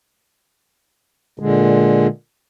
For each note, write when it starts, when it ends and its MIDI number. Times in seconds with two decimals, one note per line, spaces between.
1.40 2.07 46
1.40 2.07 50
1.40 2.07 56